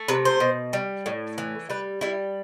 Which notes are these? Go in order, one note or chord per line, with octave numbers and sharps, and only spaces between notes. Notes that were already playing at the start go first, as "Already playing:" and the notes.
Already playing: A3
C3 B4
C5
B2
G3
A2
E3
G3 B4
G3 E4